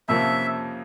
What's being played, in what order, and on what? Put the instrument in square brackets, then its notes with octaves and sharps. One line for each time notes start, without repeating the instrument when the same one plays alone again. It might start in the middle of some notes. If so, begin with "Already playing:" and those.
[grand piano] F2 C3 F3 A#3 C#4 [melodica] E5